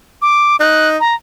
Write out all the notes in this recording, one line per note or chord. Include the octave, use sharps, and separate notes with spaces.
D6
D#4 F#6
A#5